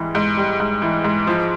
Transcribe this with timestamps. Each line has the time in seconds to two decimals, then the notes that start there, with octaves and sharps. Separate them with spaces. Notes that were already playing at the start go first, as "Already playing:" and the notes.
Already playing: G#2 E3 G3
0.15 G#2
0.37 G3
0.60 G#2
0.82 E3
1.04 G#2
1.27 F3